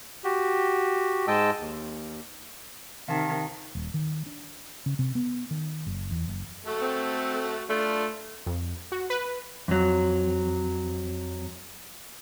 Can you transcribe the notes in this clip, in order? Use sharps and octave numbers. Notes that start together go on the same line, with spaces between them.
F#4 G4
G#2 G#3 D#5 G5 A5 E6
D#2
C3 D#3 F5 A5
D#1
D#3
D4
C#3
C3
B3
D#3
F#1
E2
F#1
A3 F#4 A4
C4
A3 D4 F4
F2
F#4
B4
F2 F#3